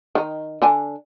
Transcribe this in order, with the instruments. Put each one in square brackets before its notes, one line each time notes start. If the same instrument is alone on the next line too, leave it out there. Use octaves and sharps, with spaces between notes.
[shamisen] D#3 D#4
D3 D4 G#5